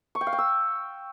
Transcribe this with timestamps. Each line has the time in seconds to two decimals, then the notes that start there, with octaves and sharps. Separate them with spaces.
0.15 C#6
0.21 G5
0.27 F5
0.33 G5
0.38 E6